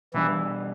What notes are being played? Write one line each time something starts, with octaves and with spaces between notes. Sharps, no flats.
B2 E3 G3 D4